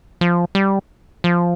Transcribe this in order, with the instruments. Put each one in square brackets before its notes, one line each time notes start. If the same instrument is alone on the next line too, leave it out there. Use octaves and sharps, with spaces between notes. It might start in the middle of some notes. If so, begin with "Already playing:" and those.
[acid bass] F3
G3
F3